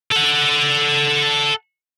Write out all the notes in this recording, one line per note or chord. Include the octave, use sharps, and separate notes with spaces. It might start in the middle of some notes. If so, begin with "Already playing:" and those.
A4 F#5